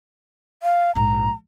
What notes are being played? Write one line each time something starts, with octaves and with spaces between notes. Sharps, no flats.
F5
A#1 G#2 A#5